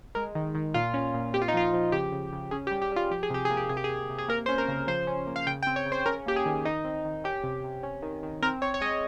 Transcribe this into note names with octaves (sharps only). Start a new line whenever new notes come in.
G#3 A#4
D#3
D#3
A#2 F4
C#4
A#2
C4 G4
F4
D#4
F3 F4
F3
C#3 G4
C#3
C#3
C#4 G#4
G4
G3
G4
G3 F4
F3 G4
G#4
C3 G4
G#4
A#3
G4
C3 G#4
G4
G#4
C3
C3
G#4
A#3 A#4
C#4 C5
A#4
C#3
F3 C5
C#4
A#3
F5
C#3 G5
G5
C4
C#5
C#3
C5
C#4 A#4
A#3 G4
G#4
D#3
D#3 D#4
C4
D#3
C#4 G4
C3
C3
C#4
D#3
D#3
C4 A#4
C4 C#5
C#5
G#3 D#5